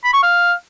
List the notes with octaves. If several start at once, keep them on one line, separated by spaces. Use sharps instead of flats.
B5
C#6
F5